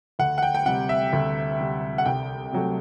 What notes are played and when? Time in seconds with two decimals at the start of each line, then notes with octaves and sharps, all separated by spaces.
0.19 D2 F#5
0.38 F#5
0.43 G5
0.55 G5
0.66 C3 G3 F#5
0.89 E5
1.13 D2
1.59 C3 G3
1.98 F#5
2.05 C2 G5
2.53 C3 F#3 A3